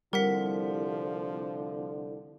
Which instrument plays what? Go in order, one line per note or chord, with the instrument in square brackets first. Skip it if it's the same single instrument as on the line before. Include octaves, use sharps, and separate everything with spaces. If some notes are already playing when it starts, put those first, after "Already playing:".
[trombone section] C2 D3 [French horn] F3 [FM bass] G3 [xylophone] A#4 F#5 B6